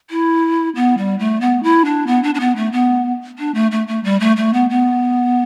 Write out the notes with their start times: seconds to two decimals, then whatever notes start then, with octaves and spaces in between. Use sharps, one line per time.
0.10 E4
0.76 B3
0.98 G3
1.19 A3
1.41 B3
1.63 E4
1.85 D4
2.07 B3
2.23 D4
2.35 D4
2.40 B3
2.56 A3
2.72 B3
3.39 D4
3.55 A3
3.71 A3
3.88 A3
4.04 G3
4.20 A3
4.37 A3
4.54 B3
4.70 B3